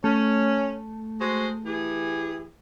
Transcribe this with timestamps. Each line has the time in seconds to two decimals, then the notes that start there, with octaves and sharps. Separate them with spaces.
0.04 A3 C#4
1.20 G#3 F#4 C5
1.66 E3 G4 G#4